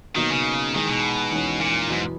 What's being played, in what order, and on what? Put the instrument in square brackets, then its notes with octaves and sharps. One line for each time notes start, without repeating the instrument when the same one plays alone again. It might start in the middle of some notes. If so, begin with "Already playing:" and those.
[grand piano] B2 F#3 A#3 D#4 [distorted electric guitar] D#3
[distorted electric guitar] C#3
[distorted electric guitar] D#3 [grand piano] E3 G#3 D#4 G#4
[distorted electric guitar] B2
[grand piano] E2 D#3 G#3 C#4
[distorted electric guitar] A#2
[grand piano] E2 B2 F#3 B3 E4 [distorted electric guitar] G#2